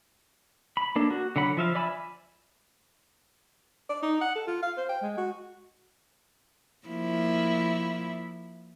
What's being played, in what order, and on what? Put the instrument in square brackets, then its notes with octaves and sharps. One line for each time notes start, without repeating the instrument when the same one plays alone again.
[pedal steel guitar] B5
A#3 D4 A4
F#4
D3 F#3 F#5 B5
F3 E5 F5
D5 E5 G#5 B5 E6
[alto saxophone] D5
D#4
F#5
A4
F4
F5
C5
G5
G#3
F#4
[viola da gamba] F3 A#3 E4